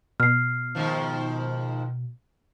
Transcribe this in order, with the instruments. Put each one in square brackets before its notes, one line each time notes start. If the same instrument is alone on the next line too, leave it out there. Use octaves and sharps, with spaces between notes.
[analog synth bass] B2 [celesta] F6 C7
[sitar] G#2 D#3 F3